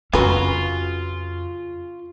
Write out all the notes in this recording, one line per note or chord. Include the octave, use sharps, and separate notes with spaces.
F2 C#3 F#3 C#4 F4 F#4 B4 G#5